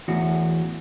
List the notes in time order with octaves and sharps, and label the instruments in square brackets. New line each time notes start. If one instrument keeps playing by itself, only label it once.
[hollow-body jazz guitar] E2 A2 F#4